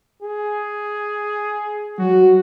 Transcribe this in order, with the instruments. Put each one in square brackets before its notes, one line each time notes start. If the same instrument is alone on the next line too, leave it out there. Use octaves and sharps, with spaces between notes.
[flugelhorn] G#4
[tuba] F#3 [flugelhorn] F#4